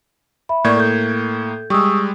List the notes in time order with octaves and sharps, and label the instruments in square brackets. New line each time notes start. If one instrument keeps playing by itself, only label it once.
[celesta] E5 B5
[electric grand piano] A2 A#3 G#6 [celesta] D5 C#6 G6
[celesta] A4 G6
[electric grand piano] G3 G#3 [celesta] C#6 D#6 E6